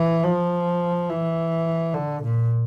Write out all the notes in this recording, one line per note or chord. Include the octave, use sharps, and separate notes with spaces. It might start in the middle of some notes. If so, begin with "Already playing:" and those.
Already playing: E3
F3
E3
D3
A#2